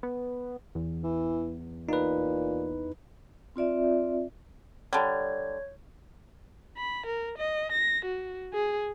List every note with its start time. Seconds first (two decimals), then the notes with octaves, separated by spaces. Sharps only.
0.03 B3
0.75 E2
1.03 E3
1.89 A#2 D#4 B4
3.56 C4 F4 D5 E5
4.93 D3 G3 C#5 G#6
6.77 B5
7.06 A#4
7.38 D#5
7.72 A#6
8.05 F#4
8.54 G#4